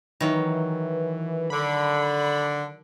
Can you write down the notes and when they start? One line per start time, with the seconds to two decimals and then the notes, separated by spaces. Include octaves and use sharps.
0.20 D#3 E3 F#3
1.50 D3 B5